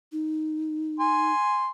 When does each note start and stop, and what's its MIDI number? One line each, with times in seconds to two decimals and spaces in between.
0.12 1.32 63
1.00 1.71 80
1.00 1.71 84